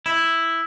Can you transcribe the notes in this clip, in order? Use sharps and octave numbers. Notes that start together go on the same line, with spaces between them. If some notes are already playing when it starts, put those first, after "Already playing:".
E4